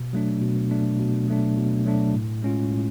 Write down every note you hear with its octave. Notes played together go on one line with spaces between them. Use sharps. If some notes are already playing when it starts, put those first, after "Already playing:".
Already playing: B2
F#3 A3 D4
B2
F#3 A3 D4
B2
F#3 A3 D4
B2
F#3 A3 D4
A2
G#3 C#4 F4
A2